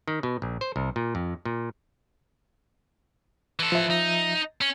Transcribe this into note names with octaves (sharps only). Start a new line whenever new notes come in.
D#3
B2
A#1
C5
C2
A#2
F2
A#2
E3 A4
F3 E5
D#4
C#4